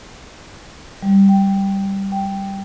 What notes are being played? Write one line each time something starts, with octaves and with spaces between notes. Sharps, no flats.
G3
G5
G5